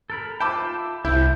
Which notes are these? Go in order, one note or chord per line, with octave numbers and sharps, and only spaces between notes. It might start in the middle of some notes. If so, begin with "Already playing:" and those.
A4 A#4 B5
F4 E5 G5 A5 B5 D6
C2 E4 G5